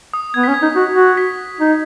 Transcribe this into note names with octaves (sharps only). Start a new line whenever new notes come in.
D#6
B3 G#6
B6
C#4
G#6
D#4
F#4
F#4
B6
D#4